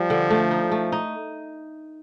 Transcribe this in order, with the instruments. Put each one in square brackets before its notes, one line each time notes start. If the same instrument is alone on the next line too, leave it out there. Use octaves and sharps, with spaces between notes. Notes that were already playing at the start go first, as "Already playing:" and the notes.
Already playing: [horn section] F3 [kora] G3
[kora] D3
A3
D#4
A3
D#4